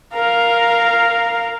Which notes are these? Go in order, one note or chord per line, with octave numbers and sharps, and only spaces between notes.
A#4 F5